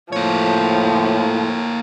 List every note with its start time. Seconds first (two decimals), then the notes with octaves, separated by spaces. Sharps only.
0.12 A2 F3 A#3 C#5